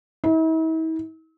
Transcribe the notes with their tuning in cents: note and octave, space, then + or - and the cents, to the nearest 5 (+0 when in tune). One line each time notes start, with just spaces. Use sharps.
E4 -45